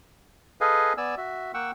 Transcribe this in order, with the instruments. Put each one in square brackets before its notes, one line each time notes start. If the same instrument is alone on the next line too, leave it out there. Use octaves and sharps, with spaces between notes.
[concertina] G#4 A4 B4 D#5 F5 G#5
B3 D5 G#5 E6
F#4 E5
A#3 F#5 G5 C#6 E6